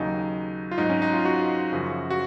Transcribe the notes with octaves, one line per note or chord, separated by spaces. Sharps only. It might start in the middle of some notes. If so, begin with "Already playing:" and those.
Already playing: D#2 C#3 F#3 D#4
F4
G#2 F#3 D#4
C#4
D#4
F4
F#4
F#2 C#3 F3
F#4